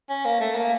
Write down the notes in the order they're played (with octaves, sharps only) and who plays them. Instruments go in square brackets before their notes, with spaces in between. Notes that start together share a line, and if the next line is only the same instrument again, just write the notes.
[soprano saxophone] C#4
A#3
A3
A#3